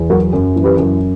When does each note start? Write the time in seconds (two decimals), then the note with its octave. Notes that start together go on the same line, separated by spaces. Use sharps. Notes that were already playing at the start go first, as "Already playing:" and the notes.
Already playing: E2
0.10 F#3 F#4 A#4
0.33 F#2
0.56 E3
0.64 G4 B4
0.79 F#2